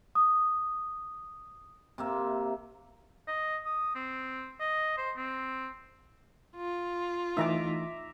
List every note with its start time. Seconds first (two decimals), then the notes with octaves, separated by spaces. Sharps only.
0.15 D#6
1.98 C3 A#3 E5
3.28 D#5
3.65 D#6
3.95 C4
4.60 D#5
4.97 C5
5.16 C4
6.56 F4
7.37 E3 A3 D#4 E5 A#5 D6